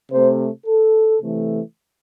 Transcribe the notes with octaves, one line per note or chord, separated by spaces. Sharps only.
C3 A3 C5
A4
C3 E3 A3